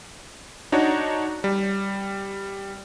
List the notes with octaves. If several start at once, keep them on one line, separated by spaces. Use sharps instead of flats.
D4 D#4 F#4 C#5
G3